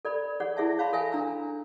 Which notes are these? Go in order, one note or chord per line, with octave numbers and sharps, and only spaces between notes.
A4 D5 B5
G#4 C#5 D5 F#5
E4 G#4 C#5 E5 F#5 A5
C#5 F5 A5 B5 C6
A4 C#5 E5 G#5
D4 A#5 E6